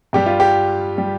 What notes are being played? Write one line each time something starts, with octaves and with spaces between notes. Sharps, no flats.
G2 G3 G4
F4
G4
G3